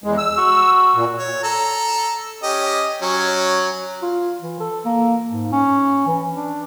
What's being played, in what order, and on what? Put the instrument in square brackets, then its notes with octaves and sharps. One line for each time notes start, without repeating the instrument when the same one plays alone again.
[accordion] E2 G#3
E6
[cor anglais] F#4
[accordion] A#2
[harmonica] C#5
A4 A#5
C#4 G4 D#5
F#3 C#4
[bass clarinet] F4
E3
A4
A#3
G#2
C#4
E3
D4